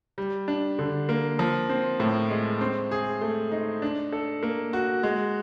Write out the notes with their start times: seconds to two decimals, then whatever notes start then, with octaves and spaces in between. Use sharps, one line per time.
0.18 G3
0.48 D4
0.79 D3
1.09 A#3
1.39 F3
1.69 C4
2.00 A2
2.30 G#3
2.61 C4
2.91 G#4
3.21 A3
3.52 D#4
3.82 D4
4.12 A4
4.43 A#3
4.73 F#4
5.03 G#3